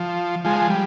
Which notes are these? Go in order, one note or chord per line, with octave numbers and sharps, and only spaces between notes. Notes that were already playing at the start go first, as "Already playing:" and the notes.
Already playing: F3
F3 G#3
G3